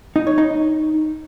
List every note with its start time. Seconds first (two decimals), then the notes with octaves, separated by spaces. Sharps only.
0.16 D#4
0.27 C#5
0.38 D#4